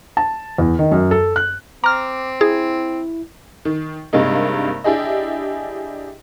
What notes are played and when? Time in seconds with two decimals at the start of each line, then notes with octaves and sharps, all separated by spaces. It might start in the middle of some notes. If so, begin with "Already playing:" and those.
0.17 A5
0.58 E2
0.79 D#3
0.92 F#2
1.11 A4
1.36 F#6
1.84 C4 A#5 D6 F6
2.41 E4 G#4
3.65 D#3
4.13 G2 C3 G#3 A#3 D#4
4.84 D4 E4 G4 G#4 D#5